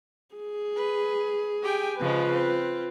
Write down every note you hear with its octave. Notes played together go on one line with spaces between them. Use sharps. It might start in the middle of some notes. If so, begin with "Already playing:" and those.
G#4
B4
G4 G5 G#5
C#3 F3 G#3 F4 B4
C4